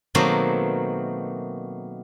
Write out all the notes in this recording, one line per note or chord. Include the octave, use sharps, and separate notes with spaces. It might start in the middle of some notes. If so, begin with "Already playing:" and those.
B2 D#3 F#3 A3 A#3 C4